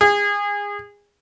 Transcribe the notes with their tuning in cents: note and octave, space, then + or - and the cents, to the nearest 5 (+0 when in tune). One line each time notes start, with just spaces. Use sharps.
G#4 -25